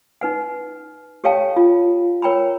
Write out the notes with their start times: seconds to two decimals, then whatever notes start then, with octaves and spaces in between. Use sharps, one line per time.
0.21 D#4 B4 F#5
1.24 G4 A4 C#5 F5 G5 A5
1.56 F4
2.22 A#4 C#5 G5 A#5 B5